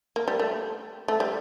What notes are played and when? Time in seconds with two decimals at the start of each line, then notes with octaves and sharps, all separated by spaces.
0.16 A#3
0.28 G3
0.39 A3
1.08 A3
1.20 G3